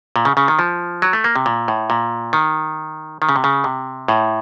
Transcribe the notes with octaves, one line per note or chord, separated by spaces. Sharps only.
A#2
C#3
C#3
D#3
F3
F#3
A3
A#3
C3
A#2
A2
A#2
D#3
D#3
C#3
C3
C#3
C3
A2